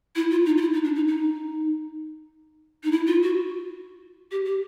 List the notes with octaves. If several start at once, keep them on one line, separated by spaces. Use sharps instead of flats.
E4
F4
D#4
F4
E4
D#4
D4
D#4
D#4
D#4
E4
F4
F#4
G4
G4